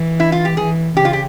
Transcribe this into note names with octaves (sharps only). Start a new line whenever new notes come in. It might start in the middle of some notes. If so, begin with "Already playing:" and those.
Already playing: E3
E4
F4
G4
E3 G#4
C#3 G4
F4
G4